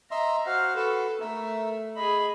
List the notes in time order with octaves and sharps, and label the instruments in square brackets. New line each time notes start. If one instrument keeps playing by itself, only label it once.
[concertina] D#5 E5 C6 [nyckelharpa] A#5
[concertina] F#4 C5 F#5 [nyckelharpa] F5
[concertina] F#4 B4 [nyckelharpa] A4
[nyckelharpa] A3 [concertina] A#4 E5
[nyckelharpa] G#4 B5 [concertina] D#5